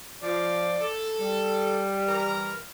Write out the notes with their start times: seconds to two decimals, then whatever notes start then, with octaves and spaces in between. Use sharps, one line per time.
0.22 F3 D5
0.80 A4
1.20 G3
2.07 E3 A#4 A#5